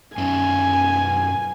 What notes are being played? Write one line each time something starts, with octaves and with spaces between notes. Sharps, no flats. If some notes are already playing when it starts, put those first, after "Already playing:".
F#2 C#4 D#4 G#5